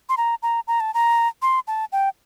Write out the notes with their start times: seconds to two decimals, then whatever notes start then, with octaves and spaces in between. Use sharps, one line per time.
0.09 C6
0.17 A#5
0.43 A#5
0.68 A#5
0.80 A5
0.94 A#5
1.42 C6
1.68 A5
1.92 G5